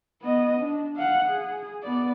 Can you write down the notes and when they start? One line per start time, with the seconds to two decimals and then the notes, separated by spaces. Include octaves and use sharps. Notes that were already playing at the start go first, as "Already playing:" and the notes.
0.22 B3 D#5
0.60 D4
0.96 F5 F#5
1.29 G#4
1.83 B3 D5